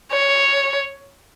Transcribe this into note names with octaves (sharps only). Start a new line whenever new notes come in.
C#5